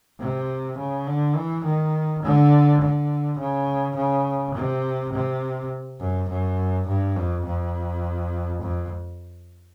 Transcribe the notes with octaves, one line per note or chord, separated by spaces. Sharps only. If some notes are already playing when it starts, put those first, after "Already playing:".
C3
C#3
D3
E3
D#3
D3
D3
C#3
C#3
C3
C3
F#2
F#2
G2
F2
F2
F2